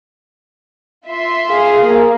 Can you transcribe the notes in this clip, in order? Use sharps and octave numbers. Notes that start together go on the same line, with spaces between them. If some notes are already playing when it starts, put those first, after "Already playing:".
F4 E5 C6
G#4 F5
A#3